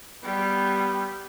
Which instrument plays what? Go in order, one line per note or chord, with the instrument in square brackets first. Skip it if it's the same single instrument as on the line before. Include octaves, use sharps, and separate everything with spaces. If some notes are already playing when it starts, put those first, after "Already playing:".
[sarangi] G3 [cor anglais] B3